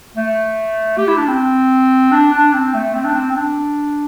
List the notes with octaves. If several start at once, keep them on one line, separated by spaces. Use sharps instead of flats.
A3
G4
E4
D4
C4
D4
D4
C4
A3
C4
D4
C4
C4
D4